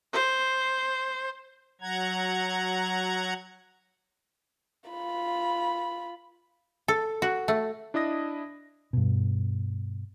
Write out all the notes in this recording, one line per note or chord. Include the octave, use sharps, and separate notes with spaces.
C5
F#3 F#5 A#5 G#6
F4 B5
A4
F#4
A3
D4 E4 D#5 D#6 A#6
G2 B2